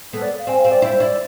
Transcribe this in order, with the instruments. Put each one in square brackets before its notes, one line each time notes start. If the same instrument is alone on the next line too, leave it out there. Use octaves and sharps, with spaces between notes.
[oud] B3 [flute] A4
[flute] D5
F5
[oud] C4 [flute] G#5
[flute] F5
[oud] C4
[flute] D5
[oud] E4 [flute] C5
[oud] E4 [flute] D5